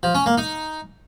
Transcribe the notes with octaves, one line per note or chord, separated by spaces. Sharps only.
F3
C#4
A#3
D#4